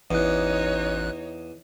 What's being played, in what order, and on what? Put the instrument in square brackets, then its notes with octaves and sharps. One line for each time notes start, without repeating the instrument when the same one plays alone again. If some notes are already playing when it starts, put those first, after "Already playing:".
[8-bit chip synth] A1 F#6 [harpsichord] E2 [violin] D#4 C#5